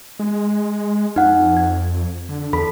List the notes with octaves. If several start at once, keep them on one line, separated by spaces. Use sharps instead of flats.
G#3
F2 D#4 F#5
G#6
D3
E2 A4 B5